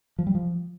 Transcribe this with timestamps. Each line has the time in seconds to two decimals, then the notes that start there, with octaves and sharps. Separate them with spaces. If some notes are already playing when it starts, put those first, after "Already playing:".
0.19 F3
0.27 G3
0.35 F3